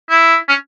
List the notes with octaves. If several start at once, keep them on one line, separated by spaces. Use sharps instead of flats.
E4
C#4